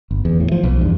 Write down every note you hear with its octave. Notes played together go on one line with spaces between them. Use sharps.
G1
E2
A2
F3
B1
E2 G2